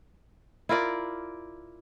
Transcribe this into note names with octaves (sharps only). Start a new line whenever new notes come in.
E4 F4 A#4 D5